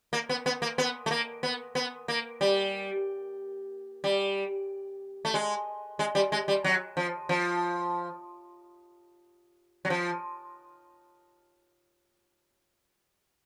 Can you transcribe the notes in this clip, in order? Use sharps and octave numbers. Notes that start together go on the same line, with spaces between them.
A#3
B3
B3
A#3
B3
A3
A#3
B3
B3
A#3
G3
G3
A3
G#3
G#3
G3
G#3
G3
F#3
F3
F3
F#3
F3